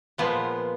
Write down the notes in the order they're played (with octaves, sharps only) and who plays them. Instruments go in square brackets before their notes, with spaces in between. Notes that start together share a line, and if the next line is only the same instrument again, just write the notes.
[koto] A#2 F3 G#3 B3